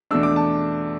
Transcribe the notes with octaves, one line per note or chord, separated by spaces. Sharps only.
E2 B2 A3 D4 E6
D6
A5